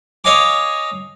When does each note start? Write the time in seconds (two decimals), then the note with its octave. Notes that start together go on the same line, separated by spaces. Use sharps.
0.24 C#5 D#5 F5 G#5 D6